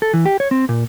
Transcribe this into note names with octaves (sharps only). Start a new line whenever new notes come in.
A4
E3
G4
C#5
C4
A#2